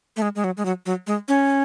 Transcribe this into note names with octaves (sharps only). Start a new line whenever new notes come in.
A3
G#3
G#3
F#3
G#3
F#3
F#3
G#3
C#4